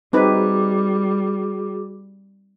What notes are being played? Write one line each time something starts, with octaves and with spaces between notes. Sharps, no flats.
G3 C4 D#4 F#4 G#4 B4 D6